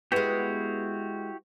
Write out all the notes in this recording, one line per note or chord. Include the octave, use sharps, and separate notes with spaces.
G#3 B3 E4 F#4 G4